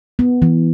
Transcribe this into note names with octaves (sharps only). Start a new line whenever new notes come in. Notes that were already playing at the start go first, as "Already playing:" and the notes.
B3
E3